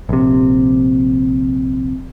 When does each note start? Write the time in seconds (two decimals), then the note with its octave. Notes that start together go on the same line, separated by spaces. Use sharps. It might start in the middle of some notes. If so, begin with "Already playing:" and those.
0.09 A#1 C3